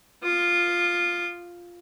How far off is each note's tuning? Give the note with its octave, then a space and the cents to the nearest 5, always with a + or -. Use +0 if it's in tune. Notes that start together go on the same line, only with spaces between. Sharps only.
F4 +0 D#6 -35